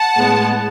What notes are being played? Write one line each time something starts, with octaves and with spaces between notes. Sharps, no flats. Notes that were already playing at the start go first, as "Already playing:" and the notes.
Already playing: F#5 A5
A2 G#3 B3